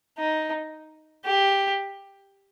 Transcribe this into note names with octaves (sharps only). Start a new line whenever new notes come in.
D#4
G4